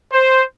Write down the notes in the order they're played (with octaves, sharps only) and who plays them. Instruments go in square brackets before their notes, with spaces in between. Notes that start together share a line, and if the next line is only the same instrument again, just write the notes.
[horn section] C5